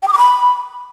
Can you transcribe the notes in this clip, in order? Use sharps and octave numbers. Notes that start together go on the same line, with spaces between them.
G5
D#6
D6
B5